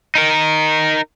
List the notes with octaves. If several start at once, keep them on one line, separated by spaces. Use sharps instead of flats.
D#4 A#4